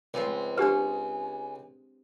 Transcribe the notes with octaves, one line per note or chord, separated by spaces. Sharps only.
C#2 F3 G#3 C4
D4 G4 G#4 B4 F#5 G#5